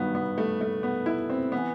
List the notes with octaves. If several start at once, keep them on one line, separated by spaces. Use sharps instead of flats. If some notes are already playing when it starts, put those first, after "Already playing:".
Already playing: G2 D#3 F#3 B3
B3
A3
A3
B3
E4
C4
E3 B3